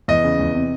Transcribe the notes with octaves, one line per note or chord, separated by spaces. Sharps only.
E2 D#5
C#3
E2
C3